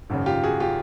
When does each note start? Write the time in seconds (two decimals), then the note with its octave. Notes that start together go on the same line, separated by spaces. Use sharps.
0.10 G#1 F#2 C#3
0.26 F4 G4
0.43 F#4 G#4
0.60 F4 G4